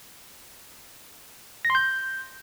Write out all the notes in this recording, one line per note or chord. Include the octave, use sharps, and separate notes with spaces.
A#6
C6
G6